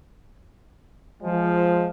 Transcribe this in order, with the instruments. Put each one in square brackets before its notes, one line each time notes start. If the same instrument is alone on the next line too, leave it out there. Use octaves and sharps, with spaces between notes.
[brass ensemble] F3 G#3